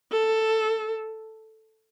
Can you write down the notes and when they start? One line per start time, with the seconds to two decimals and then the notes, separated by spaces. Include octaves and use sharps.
0.12 A4